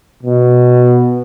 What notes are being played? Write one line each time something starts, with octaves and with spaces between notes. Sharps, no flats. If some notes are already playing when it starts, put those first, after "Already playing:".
B2